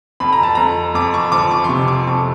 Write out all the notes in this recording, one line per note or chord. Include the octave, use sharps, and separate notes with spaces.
F2 B5
A#5
A5
F2 A#5
F2 D6
C#6
F3 D6
C#6
C6
C3 C#6
D6
F2 C#6